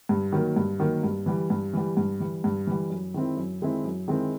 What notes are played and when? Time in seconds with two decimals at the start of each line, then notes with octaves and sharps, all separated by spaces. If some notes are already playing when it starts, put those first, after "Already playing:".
0.09 G2
0.32 D#3 F#3 A#3
0.56 G2
0.80 D#3 F#3 A#3
1.03 G2
1.26 E3 G3
1.50 G2
1.73 E3 G3
1.97 G2
2.20 E3 G3
2.44 G2
2.67 E3 G3
2.90 F#2
3.14 D#3 G#3 C4 E4
3.37 F#2
3.62 D#3 G#3 C4 E4
3.84 F#2
4.08 D#3 G#3 C4 E4